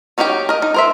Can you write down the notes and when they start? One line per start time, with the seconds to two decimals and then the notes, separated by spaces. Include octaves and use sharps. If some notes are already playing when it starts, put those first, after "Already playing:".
0.18 F#3 C#4 D#4 G4 G5
0.49 A#4 D#5
0.62 D#4
0.74 A#4 C5 E5